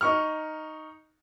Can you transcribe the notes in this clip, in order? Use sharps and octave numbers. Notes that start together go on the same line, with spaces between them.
D#4 C#6 F6